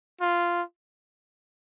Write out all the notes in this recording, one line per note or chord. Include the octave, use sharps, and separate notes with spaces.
F4